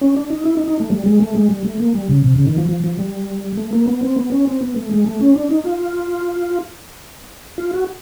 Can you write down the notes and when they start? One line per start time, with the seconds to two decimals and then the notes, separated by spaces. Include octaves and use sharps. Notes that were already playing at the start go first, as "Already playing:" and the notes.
0.01 C#4
0.17 D4
0.31 D#4
0.45 E4
0.57 D#4
0.68 D#4
0.80 A3
0.90 G3
1.06 G#3
1.20 A3
1.35 G#3
1.49 G3
1.65 A3
1.80 A#3
1.95 G3
2.09 C#3
2.24 C3
2.36 C#3
2.47 D#3
2.58 F3
2.69 F3
2.84 F3
2.99 G3
3.57 A3
3.73 A#3
3.88 B3
4.03 C4
4.17 B3
4.32 C#4
4.47 C4
4.61 B3
4.76 A3
4.91 G#3
5.06 A3
5.21 C#4
5.36 D4
5.51 D#4
5.65 F4
7.58 F4
7.73 F#4